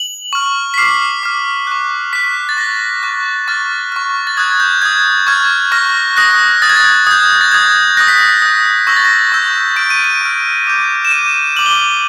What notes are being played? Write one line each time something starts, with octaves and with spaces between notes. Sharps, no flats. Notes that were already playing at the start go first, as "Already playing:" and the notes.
Already playing: F#7
C#6 F6
B6
D6 F6 C7
D6 F6
C#6 F#6
C#6 F#6 B6
A6
C#6 F#6 A#6
C#6 F#6
C#6 F6 A6
C#6 F6
A6
D#6 F#6 G#6
G6
D#6 F#6 G#6
C#6 F6 G#6
C#6 F6 A#6
D#6 F#6 A#6
D#6 F#6 A6
G#6
A6
D#6 G6 G#6
A6
D#6 G6 G#6
D#6 F#6 A#6
B6
A#6
D#6 F#6
C#6 E6 G6 A#6
A6
A#6
C#6 E6 G6
C#6 F6 D7
D#7
D7
C#6 F6
D6 G6
E7
D6 G6 D#7
D6 F6 F#7
G7
F#7